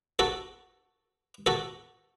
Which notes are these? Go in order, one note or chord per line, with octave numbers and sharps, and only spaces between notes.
F#4 A4
F#4 A4